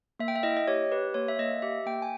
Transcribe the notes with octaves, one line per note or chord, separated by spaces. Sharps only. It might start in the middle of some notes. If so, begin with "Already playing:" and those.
A#3 E5
G5
E5
E4 D#5
D#5
G4 C#5
G4 B4
A#3 C#5
E5
A#3 D#5
G4 E5
A#3 G5
G#5